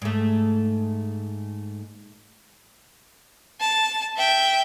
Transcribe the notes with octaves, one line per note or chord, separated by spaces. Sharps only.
G#2 A3
A5
E5 G5